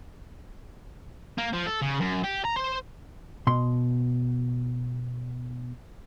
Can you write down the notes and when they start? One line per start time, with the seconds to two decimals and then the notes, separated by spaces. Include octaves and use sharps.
1.38 A#3
1.53 F3
1.67 A4
1.82 C#3
2.01 F#2
2.24 G4
2.45 A#5
2.56 C5
3.47 B2 C6